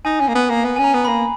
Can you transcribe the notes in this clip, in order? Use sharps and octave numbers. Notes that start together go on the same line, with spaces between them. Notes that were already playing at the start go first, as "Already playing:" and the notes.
D#4 G#5
C#4
A#3
B3
A#3
B3
C#4 G#5
A#5
B3
A#3 B5